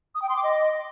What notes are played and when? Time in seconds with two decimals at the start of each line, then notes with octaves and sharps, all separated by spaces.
0.15 D#6
0.22 G5
0.29 C6
0.36 D6
0.43 D#5